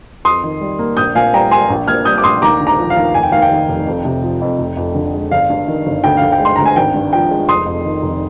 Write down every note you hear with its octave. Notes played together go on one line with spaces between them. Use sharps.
F2 C6 D#6
D#3
G3
A#3
A#1 D#6 G6
A#2 F5 G#5
G3 G5 A#5
A#3 G#5 C6
A#1
A#2 F6 G#6
G3 D#6 G6
D6
A#1 C6 D#6
D#2 A#5 D6
D3
A#5 D6
F3
F5
D#2
F1 G#5
G5
D#2 F5
G5
D#3
F1
F2
C3
F3
F2
F1
F2
D3
G#3
G1 F5
G2
D#3
G1
D2 G5
D3 F5
G5
G#3
C6
D2 A#5
G#5
G#1 G5
G2
F3 G5
G#3
F1 C6 D#6
F2
D#3
F1